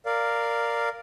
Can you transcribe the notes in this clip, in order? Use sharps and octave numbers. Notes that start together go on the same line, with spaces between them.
A#4 D5 F5